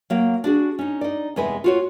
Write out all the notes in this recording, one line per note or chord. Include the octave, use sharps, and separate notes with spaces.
F#3 A#3 G5
D4 F#4 G#4
C#4 D#4
D#4 D5
E2 C3 G#3 G#4 B4 G#5
F4 F#4 C#5